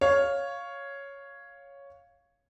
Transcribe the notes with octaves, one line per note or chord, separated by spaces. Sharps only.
C#5 F5